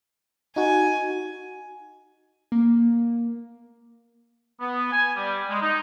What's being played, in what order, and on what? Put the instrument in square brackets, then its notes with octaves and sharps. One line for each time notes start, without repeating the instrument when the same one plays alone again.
[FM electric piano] D#4 F#4 [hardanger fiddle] G#5
[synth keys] A#3
[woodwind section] B3
G#5
G3
G#3
D#4